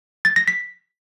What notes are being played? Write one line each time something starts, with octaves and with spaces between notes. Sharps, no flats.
A6
A#6
B6